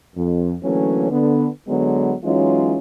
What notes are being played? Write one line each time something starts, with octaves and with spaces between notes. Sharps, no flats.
F2
D3 E3 F#3 A3 A#3 C#4
D3 B3
D3 F#3 G#3 B3
E3 F#3 G#3 C#4 D#4 F4